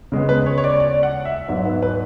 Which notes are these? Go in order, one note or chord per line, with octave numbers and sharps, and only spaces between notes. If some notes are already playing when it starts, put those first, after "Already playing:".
C#3 G#3 B3
B4
C#5
C#5
D5
D5
F#5
E5
G#2 F#3 B3 E5
B4
B4